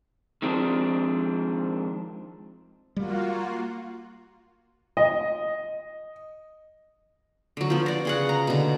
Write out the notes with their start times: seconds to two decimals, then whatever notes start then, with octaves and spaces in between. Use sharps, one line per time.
0.42 D#3 F3 G#3 C4 D4
2.96 G3 A#3 F4 F#4
4.97 D#5
7.57 D3 F#3
7.70 F3 B3
7.86 F#4 D5
8.05 C#3 G#4 F#5
8.29 A#5
8.47 B2 D3